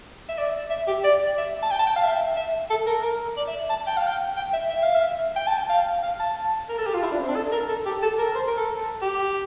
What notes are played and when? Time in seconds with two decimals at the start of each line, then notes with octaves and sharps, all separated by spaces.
0.29 E5
0.38 D5
0.71 E5
0.88 G4
1.04 D5
1.38 E5
1.63 A5
1.71 G5
1.79 A5
1.87 G5
1.96 F5
2.04 E5
2.37 E5
2.70 A4
2.87 A#4
3.03 A#4
3.37 D5
3.48 E5
3.70 A5
3.87 G5
3.97 F5
4.08 G5
4.37 G5
4.54 E5
4.70 E5
4.83 F5
4.96 E5
5.36 G5
5.47 A5
5.58 G5
5.70 F5
6.03 F5
6.20 A5
6.69 A#4
6.79 A4
6.87 G4
6.94 F4
7.03 E4
7.12 D4
7.19 C4
7.28 D4
7.36 A4
7.52 A#4
7.69 A4
7.86 G4
8.03 A4
8.19 A#4
8.35 C5
8.48 A#4
8.57 A4
9.02 G4